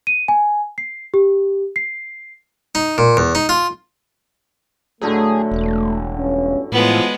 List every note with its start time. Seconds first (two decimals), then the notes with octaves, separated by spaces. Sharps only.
0.07 D#7
0.28 G#5
0.78 C7
1.14 G4
1.76 C7
2.75 D#4
2.98 A#2
3.17 E2
3.35 D#4
3.49 F4
5.02 A2 D3 F#3 A3 G#4
5.52 E1
6.17 G1 G2 C#4
6.72 A2 E3 F3 G#3 B3